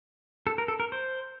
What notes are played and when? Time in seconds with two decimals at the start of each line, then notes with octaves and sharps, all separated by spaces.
0.47 A4
0.58 A#4
0.68 A4
0.80 A#4
0.92 C5